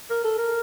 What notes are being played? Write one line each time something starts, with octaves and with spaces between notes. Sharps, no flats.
A#4
A4
A#4